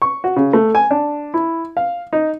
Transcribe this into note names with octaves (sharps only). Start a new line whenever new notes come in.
C#6
F#4
C#3
A3
G#5
D4
E4
F5
D#4